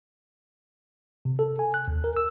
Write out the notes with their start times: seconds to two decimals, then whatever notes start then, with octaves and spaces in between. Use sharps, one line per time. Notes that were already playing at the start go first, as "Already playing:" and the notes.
1.25 C3
1.39 A4
1.59 G#5
1.74 F#6
1.88 D#2
2.04 A#4
2.17 E6